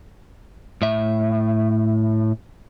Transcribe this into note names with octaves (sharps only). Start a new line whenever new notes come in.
A2 E5